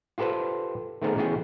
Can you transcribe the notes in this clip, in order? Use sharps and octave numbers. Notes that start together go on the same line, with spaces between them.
F4 G4 A4 B4 C5
D#3 A3 B3 C4 G#4 A#4
C#3 E3 B3 F#4 G#4 G5